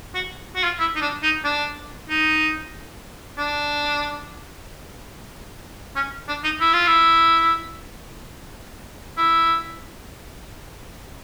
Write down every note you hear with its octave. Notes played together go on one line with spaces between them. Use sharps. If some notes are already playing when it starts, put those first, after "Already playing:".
F#4
F#4
F4
E4
D#4
D4
D#4
D4
D#4
D4
C#4
D4
D#4
E4
F4
E4
E4